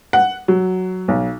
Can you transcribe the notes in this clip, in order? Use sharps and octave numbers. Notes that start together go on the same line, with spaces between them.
F#5
F#3
B1